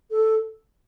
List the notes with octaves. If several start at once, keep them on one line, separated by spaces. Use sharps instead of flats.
A4